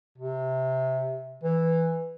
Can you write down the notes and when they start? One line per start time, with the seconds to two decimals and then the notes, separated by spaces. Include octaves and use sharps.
0.18 C3
1.44 E3